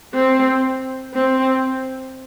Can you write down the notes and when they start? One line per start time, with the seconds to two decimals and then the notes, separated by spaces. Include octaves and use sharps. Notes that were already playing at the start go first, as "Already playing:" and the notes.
0.14 C4
1.14 C4